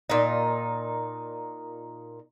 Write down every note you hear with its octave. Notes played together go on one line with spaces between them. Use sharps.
A#2 D#4